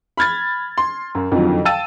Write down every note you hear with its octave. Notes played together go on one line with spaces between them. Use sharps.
B5 F6 G#6 A6
C6
F#2
F2 D3 D#3 F3 F#3
F5 G5 A5 E6 A6 D#7